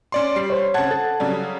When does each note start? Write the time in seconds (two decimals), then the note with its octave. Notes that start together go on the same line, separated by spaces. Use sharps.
0.12 C#4 D5 C6
0.36 G3 C7
0.50 C5 C#5
0.74 C#3 F#5 A5 G#6
0.91 A4 A6
1.20 C#3 F#3 G3